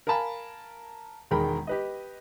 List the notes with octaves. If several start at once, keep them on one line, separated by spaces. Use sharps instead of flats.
A#4 F5 G#5 A5 B5
E1 D#3 G#3 A#4 G5 B5
G4 B4 D#5